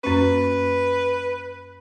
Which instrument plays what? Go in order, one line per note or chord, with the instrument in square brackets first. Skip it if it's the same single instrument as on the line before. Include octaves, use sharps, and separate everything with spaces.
[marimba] F#2 A#3 C#4 [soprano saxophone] B4